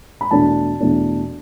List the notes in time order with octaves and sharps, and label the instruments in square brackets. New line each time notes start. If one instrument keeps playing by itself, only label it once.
[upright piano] B5
E2 B2 A3 D4 A5
E2 B2 A3 D4